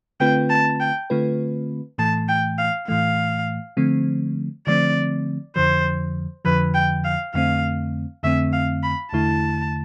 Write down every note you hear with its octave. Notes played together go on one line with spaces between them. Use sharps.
D3 A3 C4 F4 B4 G5
A5
G5
D3 A3 C4 F4 B4
A2 E3 A3 A5
G5
F5
A2 E3 A3 F5
D3 F3 A3 C4
D3 F3 A3 C4 D5
F2 D3 F3 C5
F2 D3 F3 B4
G5
F5
F2 D3 A3 C4 F5
F2 D3 A3 C4 E5
F5
B5
E2 D3 A3 E4 A5